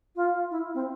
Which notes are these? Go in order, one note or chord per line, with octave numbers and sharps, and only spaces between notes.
F4
E4
C4